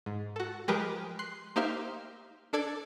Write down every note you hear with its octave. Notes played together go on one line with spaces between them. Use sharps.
G#2
F#4 A4
F3 G#3 G4 G#4 A#4 B4
C6 F#6 C7
A#3 D#4 G4 C5 E5 F5
D4 A4 D5 G#6